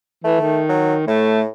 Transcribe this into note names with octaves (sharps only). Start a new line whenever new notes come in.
E3 A3
D#3
F#3
A2 A3